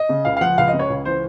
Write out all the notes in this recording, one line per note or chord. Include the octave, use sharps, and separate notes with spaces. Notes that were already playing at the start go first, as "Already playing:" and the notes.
Already playing: D#5
C#3
C#2 F5
F5
F3 F#5
C#2 F5
D#5
C#3
C#5
C#2
E3 C5